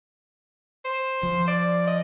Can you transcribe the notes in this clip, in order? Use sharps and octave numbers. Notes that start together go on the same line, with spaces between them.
C5
F3
D5
D#5